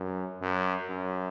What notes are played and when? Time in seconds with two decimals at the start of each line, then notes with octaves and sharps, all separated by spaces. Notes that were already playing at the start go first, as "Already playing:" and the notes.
Already playing: F#2
0.42 F#2
0.90 F#2